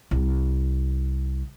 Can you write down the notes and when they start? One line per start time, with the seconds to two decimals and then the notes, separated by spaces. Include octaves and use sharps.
0.11 C2